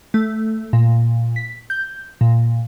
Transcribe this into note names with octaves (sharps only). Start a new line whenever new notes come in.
A3
A#2
B6
G6
A#2